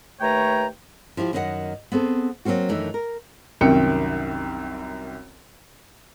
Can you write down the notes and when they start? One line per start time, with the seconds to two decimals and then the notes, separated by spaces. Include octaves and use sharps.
0.21 D#2 A3 B4 C#5 G5 A#5
1.17 F3 E4 F4 G4
1.33 F#2 D#3 D4 F4 D#5 F#5
1.92 B3 C4 G#4 A4
2.45 F#3 G3 A#3 C4 F#4
2.69 F#2 D#3 E3 A3 D4 D#4
2.94 A#4
3.61 C2 F#2 D#3 G5 C#7